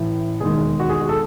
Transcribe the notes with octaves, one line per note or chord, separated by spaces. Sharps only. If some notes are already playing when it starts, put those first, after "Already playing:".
Already playing: A1 A2 E3
E1 D#2 D#3 G#3 G#4
F#4
G#4
F#4
A4